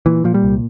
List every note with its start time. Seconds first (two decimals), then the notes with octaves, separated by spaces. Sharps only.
0.06 A#2 E3
0.24 A#2 F3
0.34 G3
0.43 C2